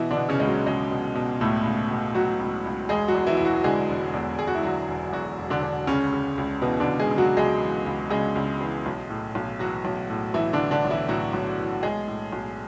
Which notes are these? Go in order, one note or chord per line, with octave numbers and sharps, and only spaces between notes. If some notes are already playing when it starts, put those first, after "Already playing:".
Already playing: B2 E3 E4
D3 D4
B2
C#3 C#4
C#2 G#3
F#3
C#2 G#3
B2
B2
C#2 A2 A3
C#2
B2
B2 F#3 F#4
C#2
C#2
E1 G#3 G#4
F#3 F#4
E2
E3 E4
E1 E4
F#3 F#4
D3 G#3 G#4
E1
E2
E1 G#4
F#4
E4
D3 F#3 F#4
E1
E2 F#3 F#4
E1
D3 D4
D3
C#2 C#3 C#4
C#3
C#2
B2 E3 B3
D3 D4
C#2
G#3 G#4
C#3
F#3 F#4
C#2 G#3 G#4
E3
C#2
C#3 G#3 G#4
C#2
E3
B1
A2
B1
E3 F#3 F#4
B1
A2
B1 E3 E4
D3 D4
E3
D3 D4
B1
E3 E4
A2 F#3 F#4
B1
E3
B1 G#3 G#4
A2
B1